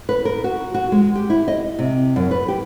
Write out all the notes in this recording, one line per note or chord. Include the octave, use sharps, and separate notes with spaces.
B4
A#4
F#4
F#4
G#3
G4
E4
D#5
C3
F#2
B4
G4